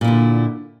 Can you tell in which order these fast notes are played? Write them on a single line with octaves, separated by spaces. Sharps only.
A#2 E4 D3